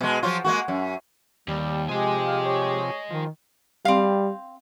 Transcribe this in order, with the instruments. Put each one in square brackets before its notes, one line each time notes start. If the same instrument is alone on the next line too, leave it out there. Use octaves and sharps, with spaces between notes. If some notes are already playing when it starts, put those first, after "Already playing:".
[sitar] B2 G#3
F3 F#3 F4
G#3 A#3 F#4
F#2
[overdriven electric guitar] D#2 [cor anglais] G3
[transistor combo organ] C3 F3 G#4 [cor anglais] G#3 [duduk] G4 [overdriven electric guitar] D#5 G#5
[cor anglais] F5
C#5
[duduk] D#3 [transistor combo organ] F3
[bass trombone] G3 [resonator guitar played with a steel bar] C4 F5